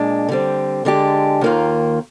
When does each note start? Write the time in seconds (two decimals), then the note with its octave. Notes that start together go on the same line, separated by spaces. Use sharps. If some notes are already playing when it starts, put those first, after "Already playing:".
Already playing: A#2 G#3 D4
0.29 D3 G3 C4
0.85 D3 G#3 D4 G4
1.41 D#2 D#3 A#3 F4